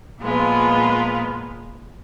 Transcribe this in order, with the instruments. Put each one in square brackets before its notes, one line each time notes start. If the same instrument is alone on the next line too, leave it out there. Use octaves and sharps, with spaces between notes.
[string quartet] A#2 F3 G#3 B3 F4